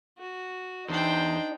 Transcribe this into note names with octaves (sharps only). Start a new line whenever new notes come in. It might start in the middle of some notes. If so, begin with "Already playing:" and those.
F#4
E2 D4 D#4 C5 G5